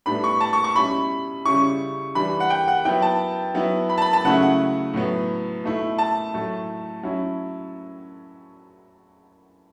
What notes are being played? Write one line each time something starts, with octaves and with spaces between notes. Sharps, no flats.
A2 G3 B3 D4 B5
C#6
A5
C#6
C#6
B2 G3 C#4 E4 B5
C#3 G3 C#4 E4 C#6
E3 G3 D4 B5
F#5
G5
F#5
F#3 B3 E4 G5
A5
F#3 B3 E4
B5
A5
B5
A5
C#3 F#3 A3 C#4 E4 F#5
F#5
A2 F#3 B3
B2 A3 E4
A5
A2 F#3 A3
F#3 C#4 E4